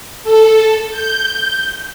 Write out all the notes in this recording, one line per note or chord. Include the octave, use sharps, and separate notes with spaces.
A4
G6